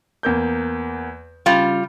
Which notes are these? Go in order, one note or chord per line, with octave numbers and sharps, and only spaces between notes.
E2 A#3 G6
C#3 G3 F4